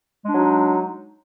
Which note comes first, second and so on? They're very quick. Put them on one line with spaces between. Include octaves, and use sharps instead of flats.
G#3 D4 F#3 D#4